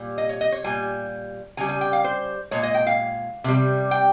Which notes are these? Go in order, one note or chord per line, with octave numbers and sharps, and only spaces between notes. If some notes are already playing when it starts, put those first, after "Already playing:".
Already playing: A#2 G3
D#5
C#5
D#5
C#5
A#2 G3 G#5
C#3 G3 G#5
G#5
G5
F5
C5
A#2 G#3 C#5
D#5
G5
F5
C3 G3
G5